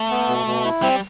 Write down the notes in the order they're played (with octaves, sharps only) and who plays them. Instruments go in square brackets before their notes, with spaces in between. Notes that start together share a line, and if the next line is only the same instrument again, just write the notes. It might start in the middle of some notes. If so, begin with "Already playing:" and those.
Already playing: [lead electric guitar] A3
[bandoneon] B3
B2
B2
E4
[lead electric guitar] G3 [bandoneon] C4